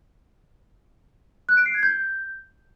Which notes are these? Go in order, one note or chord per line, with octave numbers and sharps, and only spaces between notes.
F#6
D7
C7
G#6
G6